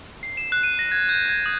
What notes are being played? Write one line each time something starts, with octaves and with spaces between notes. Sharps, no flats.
C7
E7
F#6
D#7
A#6
G#6
G6
G#6
D#6